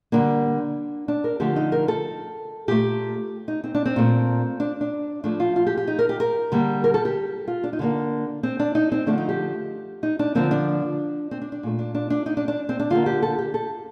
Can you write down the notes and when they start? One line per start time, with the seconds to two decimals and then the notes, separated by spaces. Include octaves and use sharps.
0.12 D3 G3 A#3 D4
1.08 D4
1.24 A#4
1.40 D3 F3 A3 G4
1.56 D#4
1.72 A#4
1.88 A4
2.68 A#2 A3 G4
3.48 D#4
3.64 C4
3.75 D4
3.85 C4
3.96 A#2 A3
4.60 D4
4.81 D4
5.24 A2 F3 A3 D4
5.40 F4
5.56 F4
5.67 G4
5.77 G4
5.87 D#4
5.99 A#4
6.09 G4
6.20 A#4
6.52 D3 G3 A#3
6.84 A#4
6.94 A4
7.05 G4
7.48 F4
7.64 D4
7.73 D#4
7.79 D3 G3 A#3 D4
8.43 C4
8.59 D4
8.75 D#4
8.92 C4
9.06 D3 F3 A3 D4
9.18 D#4
9.29 G4
10.03 D#4
10.19 D4
10.35 D3 F3 A#3 C4
10.51 D4
11.31 C4
11.42 D4
11.52 D4
11.63 A#2 A3
11.79 D4
11.95 D4
12.10 D4
12.26 D#4
12.37 D4
12.48 D4
12.69 C4
12.80 D4
12.90 D3 G3 A#3 F4
13.06 G4
13.22 A4
13.39 G4
13.54 A4